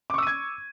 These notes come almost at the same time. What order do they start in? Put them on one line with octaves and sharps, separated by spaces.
D6 C#6 E6 D#7 G#6